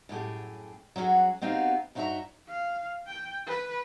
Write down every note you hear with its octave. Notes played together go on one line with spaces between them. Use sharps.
F#2 A2 G4 G#4
F#3 C#4 D4 F#4 G#4
B3 C4 D#4 F#4 G4 F5
G2 D#4 F#4 C#5 E5 A#5
F5
G5
B4